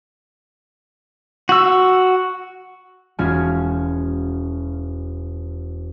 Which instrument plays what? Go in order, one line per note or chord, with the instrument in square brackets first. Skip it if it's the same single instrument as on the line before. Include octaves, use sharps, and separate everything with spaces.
[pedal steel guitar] F#4 E6
[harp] E1 C#4 F4 F#4 G#5